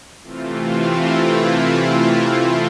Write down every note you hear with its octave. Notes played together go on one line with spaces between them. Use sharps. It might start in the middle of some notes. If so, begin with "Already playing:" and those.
C3 E3 A3 C4 F4
E4
F4